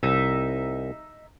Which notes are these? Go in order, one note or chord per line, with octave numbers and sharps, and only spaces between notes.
C2 D#4 E5